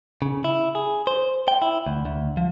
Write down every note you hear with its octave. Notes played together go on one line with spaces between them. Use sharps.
C#3
E4
G#4
C5
G5
E4
D2
D2
F3